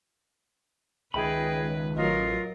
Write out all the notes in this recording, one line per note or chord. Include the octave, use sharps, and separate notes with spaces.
C#2 D#3 G#4 B4 D#5 E5 G5 B5
A1 F#3 F4 A#4 D#5